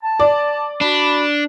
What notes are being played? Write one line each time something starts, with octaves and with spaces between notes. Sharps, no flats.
A5
D5
D4 F#4 B5